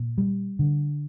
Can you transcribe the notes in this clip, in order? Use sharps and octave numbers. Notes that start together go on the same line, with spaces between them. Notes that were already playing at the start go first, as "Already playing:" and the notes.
Already playing: A#2
G3
D3